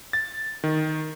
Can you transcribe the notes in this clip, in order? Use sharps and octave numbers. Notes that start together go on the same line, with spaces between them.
A6
D#3